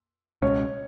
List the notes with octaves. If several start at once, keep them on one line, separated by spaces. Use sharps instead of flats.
C#2 B2 G#3 C#4 C#5